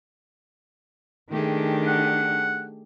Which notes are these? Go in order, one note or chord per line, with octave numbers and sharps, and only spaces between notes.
D#3 A3 D4 G4 G#4
F#5